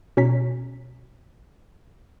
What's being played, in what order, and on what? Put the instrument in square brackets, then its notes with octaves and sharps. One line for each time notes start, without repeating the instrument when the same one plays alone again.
[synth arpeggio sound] B2 C#4 C#5 A#5 B6